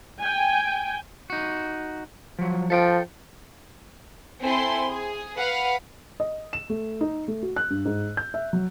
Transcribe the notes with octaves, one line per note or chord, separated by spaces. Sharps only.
G5 G#5
D#4 F#4
F3 F#3
F3 A4 E5 G5
C4 E4 A4 G#5 C6
G#4
B4 F5 F#5
D#5
E7
A3
D#4
A3
F#4
F#6
G2
G#2
G6
E5
F#3